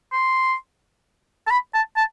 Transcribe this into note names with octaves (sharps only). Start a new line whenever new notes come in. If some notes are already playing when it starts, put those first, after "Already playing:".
C6
A5
B5
A5
A5